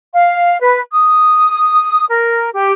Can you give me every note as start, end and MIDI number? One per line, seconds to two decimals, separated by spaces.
0.12 0.57 77
0.60 0.79 71
0.91 2.04 87
2.08 2.50 70
2.54 2.73 67